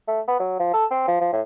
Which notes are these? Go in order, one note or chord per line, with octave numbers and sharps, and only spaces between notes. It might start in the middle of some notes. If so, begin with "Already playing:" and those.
A3
B3
F#3
F3
A4
C4
F3
F3
A2